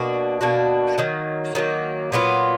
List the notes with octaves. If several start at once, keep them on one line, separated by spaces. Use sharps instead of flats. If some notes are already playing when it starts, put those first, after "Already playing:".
Already playing: B2 A#3 D4 F#4
B2 A#3 D4 F#4
D#3 F#3 A#3
D#3 F#3 A#3
A#2 F#3 B3 F4